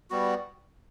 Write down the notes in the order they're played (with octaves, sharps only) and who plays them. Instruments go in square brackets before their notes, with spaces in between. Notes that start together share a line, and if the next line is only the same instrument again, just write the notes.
[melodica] G3 B3 F#4